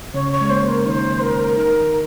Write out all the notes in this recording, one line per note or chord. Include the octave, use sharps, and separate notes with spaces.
C#3 C#4 C#5
C#5
G#3
A#3 C5
A#4
D#3 D#4 C5 C#5
A#4
D#3 D#4 A#4